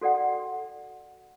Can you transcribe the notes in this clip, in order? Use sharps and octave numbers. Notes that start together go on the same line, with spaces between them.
F#4 A4 D5 F#5 G5